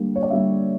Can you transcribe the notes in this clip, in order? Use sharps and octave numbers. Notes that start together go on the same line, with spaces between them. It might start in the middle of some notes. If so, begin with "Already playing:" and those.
Already playing: D3 G3 A#3
C#5
D5
D3 G3 A#3 E5